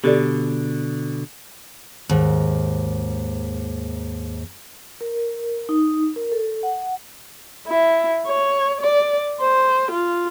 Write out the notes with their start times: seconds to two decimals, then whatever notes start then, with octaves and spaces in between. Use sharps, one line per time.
0.04 B2 D3 G4 A4 D5
2.09 D#2 G#2
5.01 A#4
5.69 D#4
6.16 A#4
6.32 A4
6.63 F#5
7.68 E4
8.26 C#5
8.81 D5
9.41 C5
9.92 F4